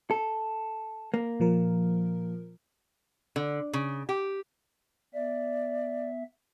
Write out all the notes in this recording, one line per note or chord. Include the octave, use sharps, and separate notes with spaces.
A4
A#3
A#2 F3 A#4
D3
C#3
G4
B3 D5 E5